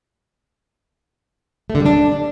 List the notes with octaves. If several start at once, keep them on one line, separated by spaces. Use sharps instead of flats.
A3
D3
G3
D4